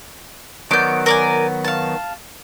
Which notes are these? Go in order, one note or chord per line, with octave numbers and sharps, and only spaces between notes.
D#3 F#3 B3 D5 G6
A#4 D5 G#5
F5 A5